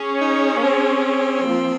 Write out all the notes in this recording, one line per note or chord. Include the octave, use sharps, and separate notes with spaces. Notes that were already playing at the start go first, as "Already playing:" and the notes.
Already playing: C#4 G#4 C#5
D#4
A#3
C4
F3 A#3 F4